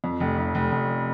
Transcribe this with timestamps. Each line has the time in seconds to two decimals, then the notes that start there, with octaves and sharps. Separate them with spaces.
0.04 F2
0.20 F1
0.38 F1
0.55 F1
0.72 F1